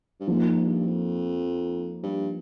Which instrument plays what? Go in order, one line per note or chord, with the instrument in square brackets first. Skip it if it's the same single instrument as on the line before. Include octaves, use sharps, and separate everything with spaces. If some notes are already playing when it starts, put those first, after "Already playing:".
[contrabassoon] G2
[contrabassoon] G#2 [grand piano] F3 A#3 D#4
[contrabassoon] A#2
G#2
G2
F2
G2